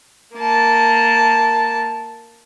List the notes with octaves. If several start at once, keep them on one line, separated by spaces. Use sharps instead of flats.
A#3 A5